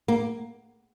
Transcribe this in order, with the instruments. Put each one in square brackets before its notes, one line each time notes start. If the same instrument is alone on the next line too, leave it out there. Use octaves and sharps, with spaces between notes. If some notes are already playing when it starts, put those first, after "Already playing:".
[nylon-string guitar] A#3